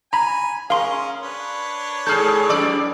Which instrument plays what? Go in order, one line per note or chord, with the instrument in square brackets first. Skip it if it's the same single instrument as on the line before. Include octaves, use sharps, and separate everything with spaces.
[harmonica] G#5 [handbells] A#5 B5
[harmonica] C#4 G#4 [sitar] A#4 [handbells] F5 C6
[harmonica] D4 B4 C#5
[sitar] G#2 G#4 A4 [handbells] F6 G6
[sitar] F#2 D5 [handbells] D6 E6